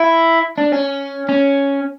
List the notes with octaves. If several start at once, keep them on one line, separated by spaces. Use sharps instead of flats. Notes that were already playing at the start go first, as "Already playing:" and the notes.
Already playing: E4
D4
C#4
C#4